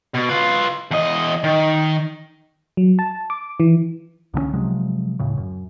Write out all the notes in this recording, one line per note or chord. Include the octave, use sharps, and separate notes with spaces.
B2
F4 B4
E2 D#5
D#3
F#3
A5
D6
E3
C2 D3 F#3 C#4
C3 F3 F#3 G#3
D1 A2 C#3
F#2